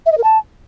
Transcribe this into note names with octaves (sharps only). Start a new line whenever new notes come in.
E5
D#5
A#4
A5